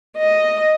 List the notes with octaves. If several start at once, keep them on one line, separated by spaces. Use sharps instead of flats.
D#5